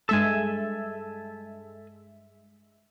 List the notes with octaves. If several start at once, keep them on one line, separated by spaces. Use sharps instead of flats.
G2 G#3 A4 E5 G#5